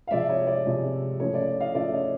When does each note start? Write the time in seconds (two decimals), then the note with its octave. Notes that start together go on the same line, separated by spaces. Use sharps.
0.07 F5
0.11 C3 F3 G#3 D5 E5
0.29 C#5 D#5
0.47 D5
0.65 C3 F3 G#3
1.20 C#3 F3 A3 C#5
1.34 D5
1.60 D#5 F5
1.74 C#3 F3 A3 D5 E5
1.92 C#5 D#5